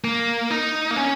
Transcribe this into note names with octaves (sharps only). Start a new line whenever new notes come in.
A#3
D#4
A#3
C#4